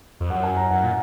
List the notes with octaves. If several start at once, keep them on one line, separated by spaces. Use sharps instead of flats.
F2
F#2 F#5
G#5
A#5
F#2 F#5
A#2